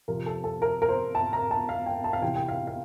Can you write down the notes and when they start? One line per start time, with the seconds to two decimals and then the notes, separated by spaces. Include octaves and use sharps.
0.08 C3 F3 A#4
0.26 A4
0.44 A4
0.62 A#4
0.82 A#4
0.89 C5
1.15 A5
1.33 A#5
1.51 A5
1.69 F5
1.86 G5
2.04 A5
2.13 F5
2.22 C3 E3 G5
2.36 G5
2.48 F5
2.67 F5